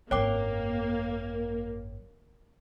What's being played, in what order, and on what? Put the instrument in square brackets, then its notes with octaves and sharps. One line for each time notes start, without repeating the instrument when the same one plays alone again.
[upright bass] G#1 F#2 [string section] A#3 [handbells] C#5 G5 D6